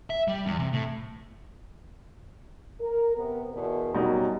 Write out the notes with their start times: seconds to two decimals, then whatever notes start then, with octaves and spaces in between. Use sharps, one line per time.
0.10 E5
0.28 G3
0.46 E2
0.59 C3
0.72 A2
2.80 A#4
3.16 C3 B3 A#4
3.51 E2 B2 A#4
3.94 F#2 B2 G3 D#4